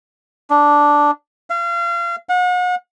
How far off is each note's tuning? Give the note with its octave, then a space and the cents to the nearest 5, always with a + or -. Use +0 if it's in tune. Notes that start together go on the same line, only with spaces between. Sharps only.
D4 -5
F5 -30
F#5 -40